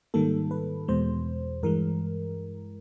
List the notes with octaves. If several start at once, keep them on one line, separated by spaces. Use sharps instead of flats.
G#2 D#3 G3 A#3 A4
B4
E2 B2 G#3 C5
G2 E3 G#3 A#4